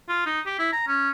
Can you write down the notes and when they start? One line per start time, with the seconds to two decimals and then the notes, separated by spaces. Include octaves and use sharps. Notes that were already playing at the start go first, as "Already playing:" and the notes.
0.09 F4
0.26 D#4
0.46 G4
0.59 E4
0.73 A#5
0.87 C#4